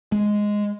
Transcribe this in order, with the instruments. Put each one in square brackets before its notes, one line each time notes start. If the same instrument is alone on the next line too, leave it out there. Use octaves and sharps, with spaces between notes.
[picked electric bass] G#3